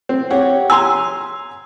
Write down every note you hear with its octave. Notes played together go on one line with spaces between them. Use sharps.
C4
G4 C#5 F#5
G#5 A#5 C6 E6